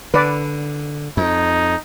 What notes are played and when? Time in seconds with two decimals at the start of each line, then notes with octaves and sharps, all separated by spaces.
0.14 D3 B4 D5
1.17 F2 D#4